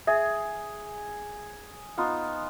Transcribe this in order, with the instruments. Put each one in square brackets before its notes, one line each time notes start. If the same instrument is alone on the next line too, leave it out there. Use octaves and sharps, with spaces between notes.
[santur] G#4 [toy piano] E5
[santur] B3 D#4 F4